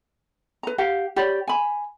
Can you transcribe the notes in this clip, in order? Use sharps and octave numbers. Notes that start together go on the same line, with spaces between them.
B4 A#5
G4 F5 F#5
G4 C#5 D5 B5
G#5 B5